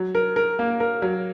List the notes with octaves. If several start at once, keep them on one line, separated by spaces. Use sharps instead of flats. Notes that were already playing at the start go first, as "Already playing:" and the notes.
Already playing: F#3
A#4
A#4
A#3
A#4
F#3